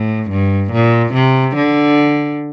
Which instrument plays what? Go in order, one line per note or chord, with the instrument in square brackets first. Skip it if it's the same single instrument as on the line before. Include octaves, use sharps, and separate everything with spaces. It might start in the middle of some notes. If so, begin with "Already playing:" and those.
Already playing: [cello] A2
G2
A#2
C3
D3